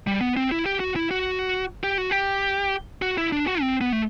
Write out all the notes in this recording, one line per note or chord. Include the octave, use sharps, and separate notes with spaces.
G3
B3
C4
E4
G4
F#4
E4
F#4
G4
F#4
G4
F#4
E4
D4
F#4
C4
B3
A3